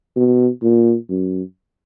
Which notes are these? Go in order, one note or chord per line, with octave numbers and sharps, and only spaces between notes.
B2
A#2
F#2